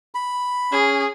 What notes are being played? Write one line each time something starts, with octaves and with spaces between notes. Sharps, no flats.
B5
C#4 G#4